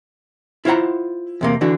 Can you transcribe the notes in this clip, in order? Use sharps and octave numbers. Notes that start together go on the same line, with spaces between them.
E4 F4 C5 F#5 A#5
E2 C3 A#3
D3 E3 D4 F#4